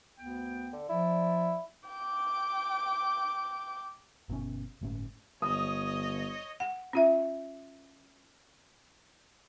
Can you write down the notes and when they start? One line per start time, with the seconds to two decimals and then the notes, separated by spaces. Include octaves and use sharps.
0.18 D2 B3 G5
0.73 D3
0.89 F3 E4 D5
1.89 G5 D6
4.29 G1 B2 D3 C#4
4.81 G1 A2 C#4
5.42 G1 C#5 D#5 D#6
6.60 F#5
6.93 C#4 F4 E5